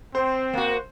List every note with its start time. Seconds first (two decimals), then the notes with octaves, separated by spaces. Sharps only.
0.15 C4 C5
0.53 A#3 F#4